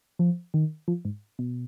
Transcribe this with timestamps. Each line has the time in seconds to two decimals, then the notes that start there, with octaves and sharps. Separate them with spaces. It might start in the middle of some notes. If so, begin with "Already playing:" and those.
0.19 F3
0.54 D#3
0.88 F3
1.05 G#2
1.39 B2